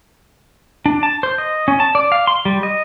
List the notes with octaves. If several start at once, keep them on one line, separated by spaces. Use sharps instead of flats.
D4
A5
C5
D#5
C#4
A5
D5
F5
C6
G3
D#5